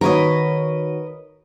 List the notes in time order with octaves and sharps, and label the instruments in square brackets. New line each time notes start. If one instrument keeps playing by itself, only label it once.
[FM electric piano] D#3 F#4 C#5 [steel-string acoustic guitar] A#4 B4 D#5